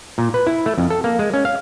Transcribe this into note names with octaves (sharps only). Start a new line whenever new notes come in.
A#2
B4
E4
A3
F2
A4
A#3
G#3
C#4
F5